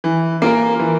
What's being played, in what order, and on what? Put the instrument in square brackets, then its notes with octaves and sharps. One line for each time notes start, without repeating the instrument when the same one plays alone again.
[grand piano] E3
A#3 F4 A#4
E3